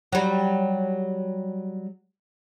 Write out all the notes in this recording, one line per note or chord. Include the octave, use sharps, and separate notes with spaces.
F#3 G3